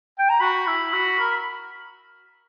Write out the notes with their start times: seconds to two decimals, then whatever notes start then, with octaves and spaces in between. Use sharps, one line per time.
0.19 G5
0.30 A#5
0.40 F#4 B5
0.67 E4
0.93 F#4
1.19 A#4